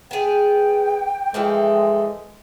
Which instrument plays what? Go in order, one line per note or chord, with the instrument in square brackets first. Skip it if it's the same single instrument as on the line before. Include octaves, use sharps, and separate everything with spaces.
[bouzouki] B3 G#4 [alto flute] G5
[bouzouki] E3 F3 A3 [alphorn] G#3